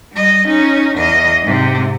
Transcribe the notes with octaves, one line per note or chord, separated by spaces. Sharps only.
G3 D#5
C#4 D#4
E2 D#5
G#2 C3